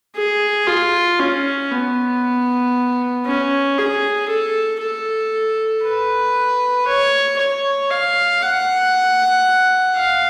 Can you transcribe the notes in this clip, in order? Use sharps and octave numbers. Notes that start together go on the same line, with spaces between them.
G#4
F4
C#4
B3
C#4
G#4
A4
A4
B4
C#5
C#5
F5
F#5
F5